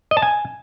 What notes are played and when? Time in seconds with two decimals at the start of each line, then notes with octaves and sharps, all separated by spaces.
0.11 D#5
0.17 A5
0.22 G#5